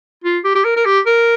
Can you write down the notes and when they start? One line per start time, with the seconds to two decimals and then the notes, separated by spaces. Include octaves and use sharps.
0.24 F4
0.44 G4
0.55 G4
0.64 A#4
0.76 A#4
0.85 G4
1.06 A#4